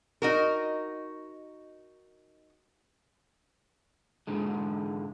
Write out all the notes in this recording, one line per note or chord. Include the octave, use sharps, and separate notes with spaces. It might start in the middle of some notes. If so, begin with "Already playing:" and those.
D#4 F#4 A#4
G#2 D3 G#3